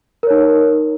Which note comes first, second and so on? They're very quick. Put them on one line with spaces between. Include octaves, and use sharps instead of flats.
A#4 C#5 D#4